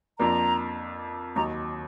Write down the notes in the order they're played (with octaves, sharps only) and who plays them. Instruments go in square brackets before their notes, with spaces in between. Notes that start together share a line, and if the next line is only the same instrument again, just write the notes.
[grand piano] F2 F3 A#3 D4 [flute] A#5
[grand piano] D#2 D#3 F#3 [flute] A#5